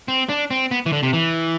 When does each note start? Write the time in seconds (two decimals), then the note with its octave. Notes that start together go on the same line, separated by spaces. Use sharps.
0.08 C4
0.29 D4
0.51 C4
0.71 B3
0.86 E3
0.93 D3
1.03 C3
1.13 E3